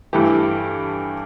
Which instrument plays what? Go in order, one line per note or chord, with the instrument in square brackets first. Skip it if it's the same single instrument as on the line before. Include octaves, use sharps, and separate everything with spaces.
[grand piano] G2 E3 A3 G4